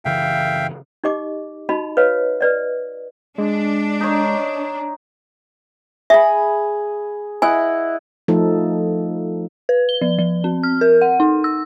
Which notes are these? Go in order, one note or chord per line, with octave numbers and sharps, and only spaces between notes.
F#1 C#3 E3 E5 F5 G5
D#4 G4 D#5 D6
D#4 F#4 D#5 A5 B5
B4 C#5 D#5 F5
B4 D5 D#5
G#3 D4
D#4 C#5
G#4 E5 B5
E4 D#5 F#5 G#5
F3 A3 D#4 A4
B4
G7
F3
F3
C4
F6
A#4
F#5
D#4
E6